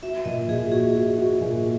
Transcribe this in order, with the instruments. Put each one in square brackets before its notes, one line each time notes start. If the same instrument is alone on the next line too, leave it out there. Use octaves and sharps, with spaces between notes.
[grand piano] F#4 [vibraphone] E5
[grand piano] A#2 [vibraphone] D#5
[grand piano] A#2 [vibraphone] G#4
[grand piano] F#4 [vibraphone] G#4
[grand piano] F#4
F#4
A#2